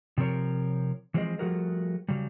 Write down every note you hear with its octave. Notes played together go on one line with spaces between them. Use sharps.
C3 F3 C4 A#4 C#5
E3 F3 G#3 C4 G#4 D#5
F3 G3 A3 F#4 G#4 A#4
C#3 F#3 G3